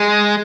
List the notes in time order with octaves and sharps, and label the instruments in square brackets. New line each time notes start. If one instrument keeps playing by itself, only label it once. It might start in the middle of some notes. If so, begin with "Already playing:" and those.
Already playing: [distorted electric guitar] G#3